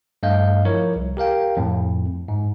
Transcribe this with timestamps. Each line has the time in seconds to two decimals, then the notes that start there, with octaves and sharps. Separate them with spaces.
0.23 G2 A3 D#5 F5 G6
0.65 F3 E4 A#4 C#5
0.96 C2
1.17 G4 A#4 F5 G5
1.57 F2 A2
2.28 G#2